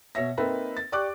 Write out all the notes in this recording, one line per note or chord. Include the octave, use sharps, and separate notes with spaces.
B2 C#5 E5 A#6
A#3 C4 D#4 A4 B4 E5
A6
G4 D5 C#6 D6 F#6